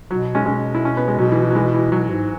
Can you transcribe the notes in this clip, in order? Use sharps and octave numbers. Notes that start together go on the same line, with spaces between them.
B2 F#3
G#3 C#4
B2 G#3 C#4
E4
C#4
B3
G#3
B2 F#3
E3
E3
F#3
E3 G#3
E3
B2 F#3
G#2